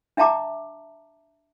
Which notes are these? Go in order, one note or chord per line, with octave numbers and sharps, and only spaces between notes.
D4 E5 F5 A5 A#5 D6